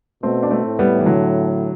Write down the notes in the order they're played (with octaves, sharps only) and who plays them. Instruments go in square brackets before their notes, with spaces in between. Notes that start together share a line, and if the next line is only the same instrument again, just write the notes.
[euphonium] B2 [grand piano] A3 C4
[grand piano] D4
A3 C4
[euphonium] A2
[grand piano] G3 B3
E3
D3 F#3